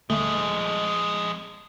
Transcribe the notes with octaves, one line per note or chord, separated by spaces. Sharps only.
D#1 F2 D3 G#3 A3